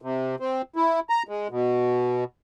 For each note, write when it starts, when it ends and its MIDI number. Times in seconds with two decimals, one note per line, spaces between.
0.02 0.36 48
0.40 0.62 60
0.76 1.00 64
1.10 1.23 82
1.28 1.48 56
1.51 2.24 47